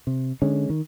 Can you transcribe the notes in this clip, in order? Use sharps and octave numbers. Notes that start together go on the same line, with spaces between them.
C3
D3 G#3 C#4
D#3